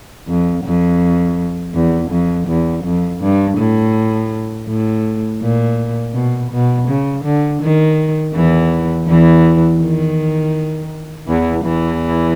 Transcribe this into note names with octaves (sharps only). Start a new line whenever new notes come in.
F2
F2
E2
F2
E2
F2
G2
A2
A2
A#2
B2
B2
C#3
D3
D#3
E2 E3
E2 E3
D#3
E2 E3
E2 E3